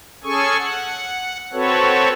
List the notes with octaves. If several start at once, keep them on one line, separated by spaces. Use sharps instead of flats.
C#4 G#4 A4 G#5 C#6
F#5
C4 F#4 A4 B4 C#5